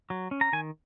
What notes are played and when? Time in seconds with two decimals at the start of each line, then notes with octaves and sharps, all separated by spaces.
0.10 F#3
0.31 C#4
0.41 A#5
0.53 D#3 G#5